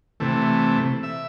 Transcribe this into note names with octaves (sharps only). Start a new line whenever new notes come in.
C3 E3 A3
E5